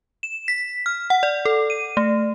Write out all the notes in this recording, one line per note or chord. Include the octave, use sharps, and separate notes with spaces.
E7
B6
F6
F#5
D5
A4
D#7
A3